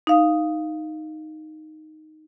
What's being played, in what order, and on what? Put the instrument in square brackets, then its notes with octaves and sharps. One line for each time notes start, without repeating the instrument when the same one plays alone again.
[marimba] D#4 F5 D#6